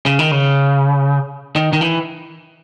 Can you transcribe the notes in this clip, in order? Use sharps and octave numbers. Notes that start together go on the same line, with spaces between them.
C#3
D#3
C#3
D#3
D#3
E3